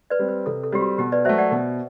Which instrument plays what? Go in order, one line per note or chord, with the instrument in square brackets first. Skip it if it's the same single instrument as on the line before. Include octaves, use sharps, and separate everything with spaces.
[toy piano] B4 D5
[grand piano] G3 C4
[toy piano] B4
[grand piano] C3 [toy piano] A4
[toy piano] A4
[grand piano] G3 C4 [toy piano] G4
[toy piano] F#4
[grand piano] B2 [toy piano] G4
[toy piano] B4 D5
[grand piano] F#3 A3 [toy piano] C5 E5
[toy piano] D5 F#5
[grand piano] B2